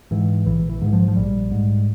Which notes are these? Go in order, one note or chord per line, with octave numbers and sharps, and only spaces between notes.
G#2 E3
A#1 E3
E3
G#2
E3
F3
F3
A#1 G3
G#2